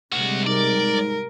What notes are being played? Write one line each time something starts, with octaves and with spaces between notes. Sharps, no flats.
D2 C3 G3 G#3 F#4
G#2 A#4 D5